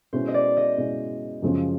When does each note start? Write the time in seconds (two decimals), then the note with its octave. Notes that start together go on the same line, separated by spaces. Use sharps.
0.13 B2 G#3 C#4 E4 C5
0.28 D#5
0.34 D5
0.57 D#5
0.78 B2 G#3 C#4 E4
1.42 F#2 C#3 F3 G#3 C#4